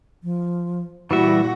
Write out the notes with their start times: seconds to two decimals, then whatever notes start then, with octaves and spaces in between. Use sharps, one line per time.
0.23 F3
1.11 A#2 E3 G3 E4 F#4 E5